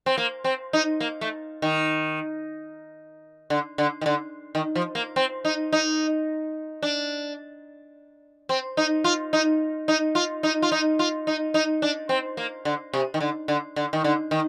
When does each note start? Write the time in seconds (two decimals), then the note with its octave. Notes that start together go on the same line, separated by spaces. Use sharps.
0.06 C4
0.18 A#3
0.44 C4
0.73 D#4
1.00 A#3
1.21 A3
1.62 D#3
3.50 D3
3.78 D3
4.01 D#3
4.06 D3
4.55 D#3
4.75 F3
4.95 A#3
5.16 C4
5.45 D#4
5.73 D#4
6.83 D4
8.49 C4
8.77 D#4
9.04 F4
9.33 D#4
9.88 D#4
10.15 F4
10.43 D#4
10.62 F4
10.72 D#4
10.99 F4
11.27 D#4
11.54 D#4
11.82 D4
12.09 C4
12.37 A#3
12.65 D3
12.93 C3
13.14 D#3
13.20 D3
13.48 D3
13.76 D3
13.93 D#3
14.04 D3
14.31 D#3